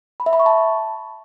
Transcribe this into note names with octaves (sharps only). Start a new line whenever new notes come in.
B5
E5
B5
C#6
A5